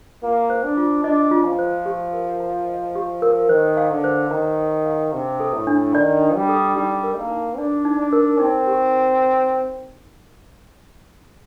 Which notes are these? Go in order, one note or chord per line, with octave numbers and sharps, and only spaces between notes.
A#3 F4
C5
D4
F4
D4 D#5
F4
F3
C5
G4
A#4
A#5
D#5
G4
A#4
D#3 C5
F5
D3
C5
D#3 A#5
C5
F5
C3 D4
A4
A2
D4
D#3 D5
D4
G3
A4
G3 D#4
A#4
A#3
D#4
D4 D5
D#4
D4
A#4
C4 D#4
G4